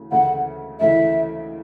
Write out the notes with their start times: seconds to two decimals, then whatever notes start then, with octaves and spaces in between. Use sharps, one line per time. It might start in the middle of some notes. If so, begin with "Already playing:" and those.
Already playing: D2 C#3 E3
0.12 D2 C#3 E3 A3 E4 F#5
0.80 D2 C#3 E3 A3 E4 E5